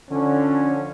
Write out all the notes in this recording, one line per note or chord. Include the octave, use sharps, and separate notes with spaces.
D3 F3 C#4